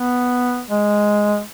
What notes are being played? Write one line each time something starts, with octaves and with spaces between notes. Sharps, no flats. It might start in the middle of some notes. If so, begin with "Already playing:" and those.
Already playing: B3
G#3